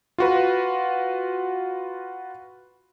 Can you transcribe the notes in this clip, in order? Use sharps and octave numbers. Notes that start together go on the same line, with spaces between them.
F4 F#4 B4